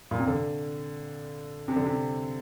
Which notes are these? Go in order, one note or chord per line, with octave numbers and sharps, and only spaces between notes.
A#2
C3
D3
C3
D3
C3